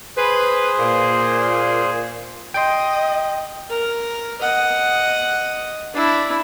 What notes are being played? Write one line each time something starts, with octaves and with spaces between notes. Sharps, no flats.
G#4 B4 C5
A#2
D#5 G5 C6
A#4
D#5 F#5
D4 E4